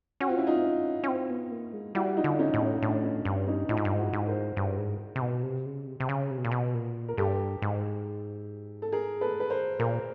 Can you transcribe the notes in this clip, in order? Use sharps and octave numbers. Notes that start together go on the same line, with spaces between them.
C#4 F#4
C4 F4
C#4 E4
D#4 F4
C4
C#4
C#4
C4
B3
A#3
G#3
G3 E4 F#4
D#4 F4
D3
C#4 D#4
A2
C#4 D#4
A2 D4
C#4
G2 D4
C#4 D#4
A2 D#4 F4
G#2
G2
G#2 E4 F#4
G#2
A#4 C5
G2
G#2
C3
B2
C3
C#3
C3
C3
C#3
C3
B2
A#2
B2
A#2
A#4
G2 G4 A4
G#2
A4
G#4 A#4
A4 B4
B4
A#4 C5
A#2 A#4 C5